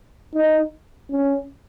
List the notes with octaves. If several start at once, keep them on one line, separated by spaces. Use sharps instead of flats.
D#4
C#4